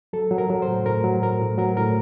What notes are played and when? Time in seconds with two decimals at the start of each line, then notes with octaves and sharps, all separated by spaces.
0.13 F#3 A4
0.31 F#3
0.38 A#4
0.50 F#3
0.62 C5
0.68 A2
0.86 A2 A#4
1.04 F#3
1.22 A2 A#4
1.41 A2
1.58 F#3 A#4
1.77 A2 A#4